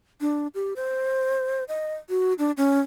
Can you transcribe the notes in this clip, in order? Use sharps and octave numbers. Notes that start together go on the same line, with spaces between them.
D4
G4
C5
D#5
F#4
D4
C#4